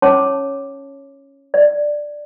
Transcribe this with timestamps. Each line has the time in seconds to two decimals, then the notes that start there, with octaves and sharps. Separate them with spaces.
0.02 C#4 C#5 A5 C6 D6
1.54 D5